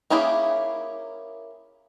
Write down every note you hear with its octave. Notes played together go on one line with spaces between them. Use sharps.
A#3 C#4 E4 G4 G#4